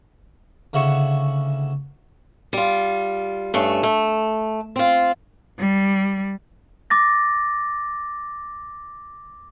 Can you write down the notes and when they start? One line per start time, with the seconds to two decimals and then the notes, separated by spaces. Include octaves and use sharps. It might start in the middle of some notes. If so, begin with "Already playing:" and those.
0.73 D2 C#3 E4 F#4 C#6
2.53 G3 F4
3.54 G2 A3 C#4
3.83 A3
4.76 C4 F4
5.58 G3
6.90 D6 A6 A#6